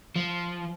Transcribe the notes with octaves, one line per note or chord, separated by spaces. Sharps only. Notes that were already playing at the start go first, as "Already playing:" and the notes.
F3